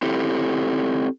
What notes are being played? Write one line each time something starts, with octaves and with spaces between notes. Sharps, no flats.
C4 E4 G4 A4